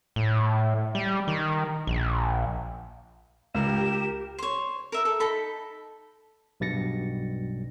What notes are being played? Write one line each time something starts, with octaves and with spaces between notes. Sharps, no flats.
A2
G3
D#3
A#1
C#2 G4 A#4 E7
C5 C#5
A#4 E5
A4
D#4 A4 B5
B1 G2 B2 A6 A#6 C#7